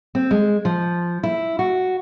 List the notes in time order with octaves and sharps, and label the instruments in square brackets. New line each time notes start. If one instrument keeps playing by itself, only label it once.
[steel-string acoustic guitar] C4
G#3
F3
E4
F#4